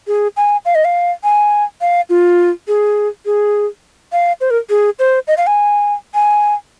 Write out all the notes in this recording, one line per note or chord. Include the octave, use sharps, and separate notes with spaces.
G#4
G#5
F5
D#5
F5
G#5
F5
F4
G#4
G#4
F5
C5
A#4
G#4
C5
D#5
F5
G#5
G#5